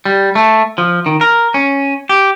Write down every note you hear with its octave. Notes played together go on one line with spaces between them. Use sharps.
G3
A3
F3
D#3
A#4
C#4
G4